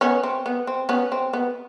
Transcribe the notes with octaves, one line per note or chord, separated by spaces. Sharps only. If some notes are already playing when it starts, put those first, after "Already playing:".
B3 C#4
C4
B3
C4
B3 C#4
C4
B3